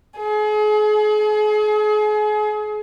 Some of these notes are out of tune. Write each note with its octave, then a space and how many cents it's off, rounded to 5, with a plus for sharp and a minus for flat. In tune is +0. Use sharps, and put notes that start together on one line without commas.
G#4 +35